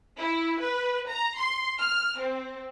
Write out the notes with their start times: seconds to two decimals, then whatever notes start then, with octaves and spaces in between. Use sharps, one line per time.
0.18 E4
0.59 B4
1.09 A#5
1.38 C6
1.78 F6
2.18 C4